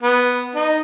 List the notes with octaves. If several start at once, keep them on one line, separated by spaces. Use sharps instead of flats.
B3
D#4